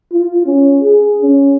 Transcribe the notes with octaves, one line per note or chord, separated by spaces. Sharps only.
F4
C#4
G#4
C#4